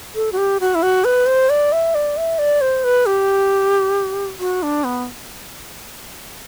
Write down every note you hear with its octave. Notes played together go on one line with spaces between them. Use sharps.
A4
F#4
G4
F#4
E4
F#4
B4
C5
D5
E5
D5
E5
D5
C5
B4
G4
F#4
D4
B3